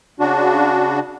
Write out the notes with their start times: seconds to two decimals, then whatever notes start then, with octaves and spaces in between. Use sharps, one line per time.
0.20 C#3 D4 F#4